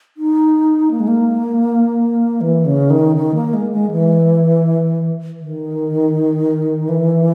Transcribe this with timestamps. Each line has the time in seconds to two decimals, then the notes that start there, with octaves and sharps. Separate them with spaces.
0.17 D#4
0.91 A#3
1.00 G#3
1.08 A#3
2.41 E3
2.65 C#3
2.90 D#3
3.16 D#3
3.35 A#3
3.54 G#3
3.72 G#3
3.91 E3
5.40 D#3
6.89 E3